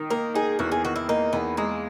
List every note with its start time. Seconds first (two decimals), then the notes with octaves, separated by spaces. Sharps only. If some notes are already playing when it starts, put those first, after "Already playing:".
Already playing: D#3 D#4
0.10 A#3 A#4
0.34 D#4 G#4
0.59 E2 F#4
0.72 G#4
0.84 D#3 F#4
0.96 E4
1.08 A#3 D#4
1.33 E2 B3
1.57 G#3 A#3